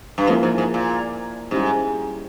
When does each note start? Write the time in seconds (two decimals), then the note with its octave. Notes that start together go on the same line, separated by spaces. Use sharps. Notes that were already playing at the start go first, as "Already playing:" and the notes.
0.18 G2
0.27 G#2 F3 A#3 E4
0.43 G#2
0.58 G#2
0.74 A#2
1.51 G#2 G3 C#4 E4 G4